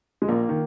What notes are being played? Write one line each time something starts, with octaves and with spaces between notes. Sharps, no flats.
G#3
A#1 A#3
D#3